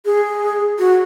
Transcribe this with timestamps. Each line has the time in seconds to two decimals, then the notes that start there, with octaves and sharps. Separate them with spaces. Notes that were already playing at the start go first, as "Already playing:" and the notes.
0.05 G#4
0.79 F#4